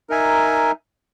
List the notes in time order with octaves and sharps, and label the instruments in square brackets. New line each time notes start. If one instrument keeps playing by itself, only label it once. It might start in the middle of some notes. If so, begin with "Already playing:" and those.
[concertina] D#4 A#4 E5 G#5